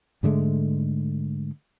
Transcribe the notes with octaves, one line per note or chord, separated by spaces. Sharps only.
G#2 D3 G#3 A3